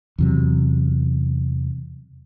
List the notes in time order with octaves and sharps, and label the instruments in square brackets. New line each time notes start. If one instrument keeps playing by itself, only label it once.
[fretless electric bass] E2 C3 F#3